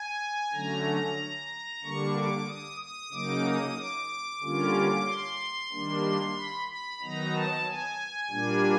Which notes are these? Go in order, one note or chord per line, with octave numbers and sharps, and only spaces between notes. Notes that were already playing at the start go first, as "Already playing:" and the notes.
Already playing: G#5
D3 F#3 A3 C#4 A#5
D3 G3 A#3 D4 C#6
D6
D#6
D#6
C#3 F#3 A#3 D#4 D6
D#6
D6
D3 G3 A#3 C#4 F4
C6
D#3 G3 A#3 D4
B5
B5
D#3 F#3 B3 D#4 A#5
A5
G#5
A#2 G3 A#3 D4